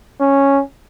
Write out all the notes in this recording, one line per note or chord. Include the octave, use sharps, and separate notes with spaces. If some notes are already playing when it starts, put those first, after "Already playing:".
C#4